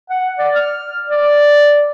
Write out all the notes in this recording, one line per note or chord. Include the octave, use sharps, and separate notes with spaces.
F#5
D5
F6
D5